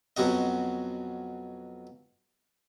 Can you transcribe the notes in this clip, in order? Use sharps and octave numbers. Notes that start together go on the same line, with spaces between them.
F2 B2 F#3 F#4 D#5